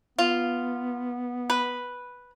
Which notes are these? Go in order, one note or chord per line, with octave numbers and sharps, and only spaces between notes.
B3 F4
B4